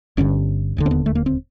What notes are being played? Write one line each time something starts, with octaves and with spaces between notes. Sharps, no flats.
G1 G2 D3 C#4
E1 D#2 D3
C4
B3
A3
A#3
C4